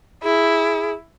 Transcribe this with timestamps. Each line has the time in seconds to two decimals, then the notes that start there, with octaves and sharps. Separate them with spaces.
0.23 E4 G#4